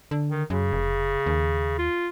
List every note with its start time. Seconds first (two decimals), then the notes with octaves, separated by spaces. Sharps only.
0.11 D3
0.30 D#3
0.50 F#2 C#3
0.72 F1
1.26 D#2
1.78 F4